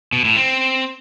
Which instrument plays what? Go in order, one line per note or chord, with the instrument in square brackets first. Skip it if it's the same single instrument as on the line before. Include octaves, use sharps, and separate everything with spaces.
[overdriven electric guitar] B2
A2
C4